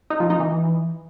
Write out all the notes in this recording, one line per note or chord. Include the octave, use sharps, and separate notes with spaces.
D#4
F3
D#4
E3